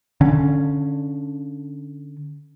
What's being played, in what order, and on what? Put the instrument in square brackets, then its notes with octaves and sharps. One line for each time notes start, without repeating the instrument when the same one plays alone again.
[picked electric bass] D3 C#4